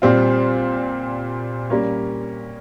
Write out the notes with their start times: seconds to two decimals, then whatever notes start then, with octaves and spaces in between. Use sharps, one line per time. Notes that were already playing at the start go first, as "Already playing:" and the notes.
0.02 A#2 G3 C4 F4
1.70 G3 A#3 C#4